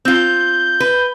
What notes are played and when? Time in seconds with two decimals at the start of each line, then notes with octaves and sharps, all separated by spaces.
0.05 C4 F4 G6
0.80 B4